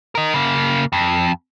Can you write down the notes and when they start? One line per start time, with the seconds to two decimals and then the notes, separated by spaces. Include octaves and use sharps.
0.15 A#4 D#5
0.34 C#3 A#3
0.93 F2